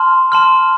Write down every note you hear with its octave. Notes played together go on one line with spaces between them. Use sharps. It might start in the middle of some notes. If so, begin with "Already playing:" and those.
Already playing: A5 C6 F6
A5 C6 F6